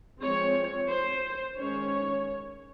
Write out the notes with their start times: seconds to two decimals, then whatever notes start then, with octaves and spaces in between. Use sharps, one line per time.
0.21 F3 G#3 C4 C#5
0.89 C5
1.58 D#3 G#3 C#4 C#5